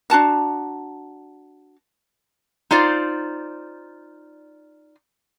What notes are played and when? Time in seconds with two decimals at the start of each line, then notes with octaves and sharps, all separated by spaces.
0.10 D4 F#4 A5 A#5
2.71 D#4 F4 C5 D5